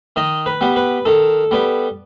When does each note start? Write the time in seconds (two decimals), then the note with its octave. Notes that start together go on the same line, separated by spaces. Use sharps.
0.16 D#3 D#5
0.46 B4
0.61 G3 B3
0.76 B4
1.05 D#3 A4
1.51 G3 B3